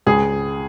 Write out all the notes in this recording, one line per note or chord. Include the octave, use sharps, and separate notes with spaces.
C#2 G#4